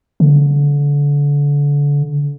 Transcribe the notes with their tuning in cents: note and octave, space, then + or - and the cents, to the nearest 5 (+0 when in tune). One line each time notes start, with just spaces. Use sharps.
D3 -30